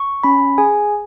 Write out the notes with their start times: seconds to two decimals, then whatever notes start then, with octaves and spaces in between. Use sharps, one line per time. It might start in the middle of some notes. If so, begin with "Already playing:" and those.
Already playing: C#6
0.24 C#4 B5
0.58 G#4 G#5